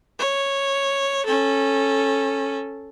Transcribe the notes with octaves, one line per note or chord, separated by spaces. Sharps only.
C#5
C#4 A4